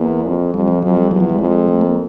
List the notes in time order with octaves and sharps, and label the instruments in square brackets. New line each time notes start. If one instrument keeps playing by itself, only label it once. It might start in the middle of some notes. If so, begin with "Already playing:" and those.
Already playing: [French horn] E2 [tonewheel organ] A#3
[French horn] F2
[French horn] F2 [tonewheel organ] G3
[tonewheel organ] F3
[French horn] F2 [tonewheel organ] F#3
[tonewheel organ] G3
[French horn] E2 [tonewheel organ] F#3
[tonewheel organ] F3
G3
[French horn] F2 [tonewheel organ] G#3
[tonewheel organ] A3
A#3